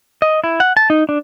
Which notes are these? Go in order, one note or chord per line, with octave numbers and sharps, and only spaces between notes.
D#5
E4
F#5
A5
D#4
D4